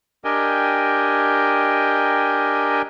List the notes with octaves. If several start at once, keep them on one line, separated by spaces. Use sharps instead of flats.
D4 G4 A#4 D#5 G5 G#5